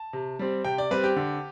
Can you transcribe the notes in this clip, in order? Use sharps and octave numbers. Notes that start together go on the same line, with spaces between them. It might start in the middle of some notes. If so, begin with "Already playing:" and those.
Already playing: A5
C3
G3 C4
C3 G5
D5
G3 C4 B4
G4
D3